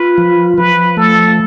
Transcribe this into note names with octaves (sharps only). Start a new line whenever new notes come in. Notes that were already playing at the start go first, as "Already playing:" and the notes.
Already playing: F4 B4
F3
F3 B4
A3 A4